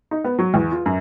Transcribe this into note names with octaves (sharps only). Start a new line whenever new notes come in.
D#4
B3
F#3
E2
F4
F#2